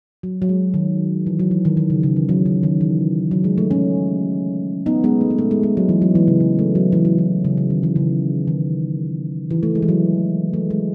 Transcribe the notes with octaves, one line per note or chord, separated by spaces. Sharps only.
F#3
F#3
G#3
D#3
E3
F#3
E3
D#3
D#3
C#3
C#3
E3
F#3
C#3
D#3
E3
F#3
G#3
A3
A3 C#4
B3 D#4
G#3 B3
A3
B3
A3
G#3
G#3
F#3
E3
F#3
E3
C#3
C#3
A3
F#3
E3
F#3
E3
C#3
C#3
D#3
E3
C#3
D#3
E3
A3
G#3
E3
F#3
A3
G#3